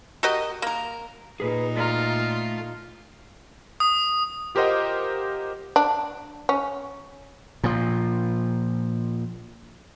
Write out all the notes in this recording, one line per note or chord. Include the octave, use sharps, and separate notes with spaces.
F#4 G4 A#4 D#5
A#3 A#4
A#2 D#4 G#4 B4
A3 F4 D5 A#5
D#6
F4 G4 A#4 C5 D#5 F#5
D4
C#4
A#2 F3